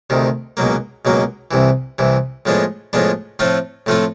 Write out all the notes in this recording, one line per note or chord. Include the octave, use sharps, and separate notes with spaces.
D2 C3 D#3
C#2 B2 F#3 A#3
C#2 B2 F#3 A#3
C2 C3 E3
C2 C3 E3
A2 F3 G#3 B3 D4
A2 F3 G#3 B3 D4
A2 F3 A3 C4 F4
A2 F3 A3 C4 F4